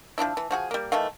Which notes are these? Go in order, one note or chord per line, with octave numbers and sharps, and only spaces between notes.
F3 F#3 D4 E4
E3
F3 F#4 G#4
G3 A#3
D#3 E3 A3 F5